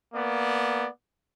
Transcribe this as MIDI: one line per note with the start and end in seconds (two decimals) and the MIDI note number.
0.14 0.88 58
0.14 0.88 59
0.14 0.88 74